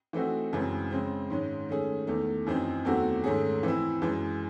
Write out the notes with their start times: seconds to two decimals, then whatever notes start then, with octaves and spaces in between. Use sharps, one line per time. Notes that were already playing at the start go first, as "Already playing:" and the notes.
0.13 E3 A3 C4 D#4 F#4
0.53 F#2 C#3 E3 G#3 C4
0.90 C#3 G#3 C4
1.30 G#2 D#3 G#3 C#4
1.69 D#3 A3 C#4 G#4
2.07 E2 D#3 A3
2.47 F#2 E3 C4 D#4
2.85 E2 D#3 A3 C4 F#4
3.24 G#2 D#3 A3 C#4 G#4
3.63 E3 C4 E4
4.02 F#2 E3 G#3